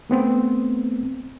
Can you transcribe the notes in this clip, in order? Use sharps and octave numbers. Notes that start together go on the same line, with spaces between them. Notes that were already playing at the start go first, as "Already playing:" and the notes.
A3 B3 C4